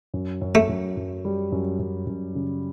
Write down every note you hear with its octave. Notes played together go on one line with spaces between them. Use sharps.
F#2
F#2
A3
F#2
F#2
G3
F#2
F#2
F#2
C#3